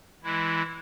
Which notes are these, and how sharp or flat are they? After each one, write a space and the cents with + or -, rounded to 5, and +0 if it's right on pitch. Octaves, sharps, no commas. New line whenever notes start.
E3 -5 G#3 +0 E4 +5